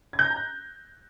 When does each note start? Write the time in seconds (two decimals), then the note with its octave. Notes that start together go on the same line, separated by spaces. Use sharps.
0.13 G#6
0.19 G6
0.25 A#6
0.30 A#5
0.36 F#6